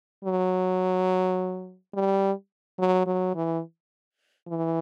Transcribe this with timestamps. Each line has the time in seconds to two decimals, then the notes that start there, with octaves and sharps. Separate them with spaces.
0.24 F#3
1.94 G3
2.79 F#3
3.06 F#3
3.35 E3
4.48 E3